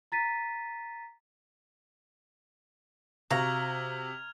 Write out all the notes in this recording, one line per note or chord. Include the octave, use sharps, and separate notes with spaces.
A#5 A6 B6 D#7
C3 F#4 F5 A#5 F6 G#6 F7